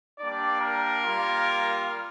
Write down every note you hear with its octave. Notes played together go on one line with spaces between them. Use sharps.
G3 A#3 D4 D5
A#4
G3 A#3 F4